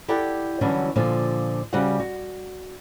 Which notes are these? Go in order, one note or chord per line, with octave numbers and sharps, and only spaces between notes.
E4 G4 A4 D5 F#5
D3 E3 F#3 G3 C#4 D4
A#2 D3 F3
C#3 G3 F#4 C5 F#5
F#4